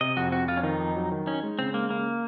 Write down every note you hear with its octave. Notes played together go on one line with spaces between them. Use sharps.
C3 D#5
F2 F#4
C4 F#4
F2 F4
C#4
D#3 D#4
F2
F#3
D#3
C#4 D#4
G#3
C#3 C4
G#3 A#3
C#3 A#3